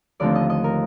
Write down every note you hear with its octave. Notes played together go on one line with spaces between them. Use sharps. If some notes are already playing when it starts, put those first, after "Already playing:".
D#2 D3 F3 A3 C4 D5
D#5
D#5
A#4